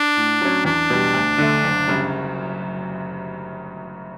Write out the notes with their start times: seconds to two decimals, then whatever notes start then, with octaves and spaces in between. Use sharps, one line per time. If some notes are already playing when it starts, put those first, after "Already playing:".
Already playing: D4
0.17 A2
0.41 F#3 C#4
0.65 E2 D4
0.90 B2 G3
1.14 D2
1.38 D3 A3
1.64 F#1
1.88 F#2 C#3 G3